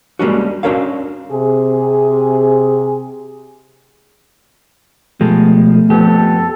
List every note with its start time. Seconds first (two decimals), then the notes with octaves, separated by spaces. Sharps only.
0.19 G3 G#3 A#3 C#4 D4 F#4
0.63 C#4 D4 F#4 A#4 C#5 F5
1.31 C3 G#4
5.21 B2 F3 G#3 A3 G4 A4
5.90 F2 F3 B3 G4 A4